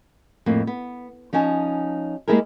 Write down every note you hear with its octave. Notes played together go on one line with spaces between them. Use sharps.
F2 A2 A#3
B3
F3 C#4 D#4 G#5 A5
G#3 A#3 E4 G4 G#4 A#4